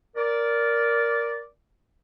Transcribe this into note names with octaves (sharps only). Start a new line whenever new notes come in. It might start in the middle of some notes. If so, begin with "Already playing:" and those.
A#4 D5